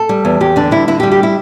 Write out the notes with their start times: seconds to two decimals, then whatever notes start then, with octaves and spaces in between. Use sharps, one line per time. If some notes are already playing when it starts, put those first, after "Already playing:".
Already playing: A4
0.09 G3
0.25 E2
0.41 E2 G4
0.56 D3 D4
0.71 G3 E4
0.88 D3 E4
1.00 G4
1.03 G3
1.12 G4
1.23 E4